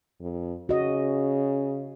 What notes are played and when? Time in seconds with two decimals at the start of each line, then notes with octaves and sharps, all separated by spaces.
0.21 F2
0.69 C#3 F#4 D#5